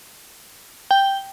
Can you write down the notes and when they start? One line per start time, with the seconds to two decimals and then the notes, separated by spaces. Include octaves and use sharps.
0.91 G5